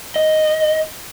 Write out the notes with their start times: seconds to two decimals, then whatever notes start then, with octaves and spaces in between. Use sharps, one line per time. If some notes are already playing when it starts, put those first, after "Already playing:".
0.16 D#5